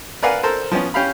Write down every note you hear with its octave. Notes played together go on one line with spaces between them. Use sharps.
A#4 B4 D5 F5 F#5 G#5
A4 A#4 C5
F3 B3 C#4
C#4 G4 F5 B5